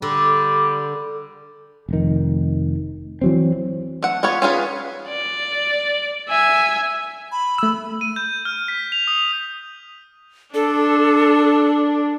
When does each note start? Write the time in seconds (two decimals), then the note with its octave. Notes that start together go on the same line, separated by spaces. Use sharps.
0.02 D3 G3
1.89 F1 D#3
3.21 E3 F#3 C4
4.03 A3 F#5
4.23 B3 F4 B4 C#5
4.42 C#4 F4 G#4 B4
5.08 D5
6.29 E5 G#5
7.32 B5
7.58 A3 E6
8.01 D#7
8.16 G6
8.45 F6
8.68 B6
8.92 F7
9.07 D#6
10.55 D4 A4